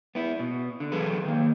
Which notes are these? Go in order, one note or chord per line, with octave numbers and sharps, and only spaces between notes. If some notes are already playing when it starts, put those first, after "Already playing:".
B3 E4
B2
D3
E3 F#3 G#4 A4 B4
D#3 A#3